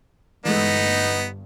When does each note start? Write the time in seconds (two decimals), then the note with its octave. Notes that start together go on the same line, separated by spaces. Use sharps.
0.45 G1 G2 E3 G#3 A3 B3 D#4